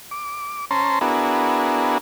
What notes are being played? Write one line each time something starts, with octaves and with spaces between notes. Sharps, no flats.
D6
C#4 C5 A5 A#5 C6
B3 D4 E4 F#4 G#4 A#4